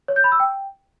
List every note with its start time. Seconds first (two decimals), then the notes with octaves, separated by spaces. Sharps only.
0.08 C#5
0.16 G6
0.24 B5
0.32 E6
0.40 G5